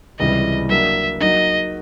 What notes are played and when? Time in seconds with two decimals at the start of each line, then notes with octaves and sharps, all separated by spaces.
0.19 C#2 C3 E3 G3 D#5
0.69 F#3 A#3 D4 E5
1.21 F#3 A#3 D#4 D#5